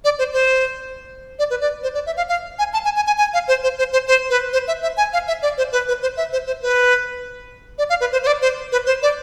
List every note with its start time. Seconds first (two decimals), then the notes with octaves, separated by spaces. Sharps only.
0.04 D5
0.19 C5
0.33 C5
1.39 D5
1.50 B4
1.61 D5
1.83 C5
1.95 D5
2.06 E5
2.17 F5
2.29 F5
2.59 G#5
2.73 A5
2.85 G#5
2.96 G#5
3.07 G#5
3.18 G#5
3.34 F5
3.48 C5
3.63 C5
3.78 C5
3.93 C5
4.08 C5
4.30 B4
4.53 C5
4.68 E5
4.83 E5
4.97 G#5
5.13 F5
5.28 E5
5.42 D5
5.58 C5
5.72 B4
5.88 B4
6.02 C5
6.17 E5
6.32 C5
6.47 C5
6.62 B4
7.78 D5
7.90 F5
8.01 B4
8.12 C5
8.23 C5
8.27 D5
8.42 C5
8.72 B4
8.86 C5
9.03 D5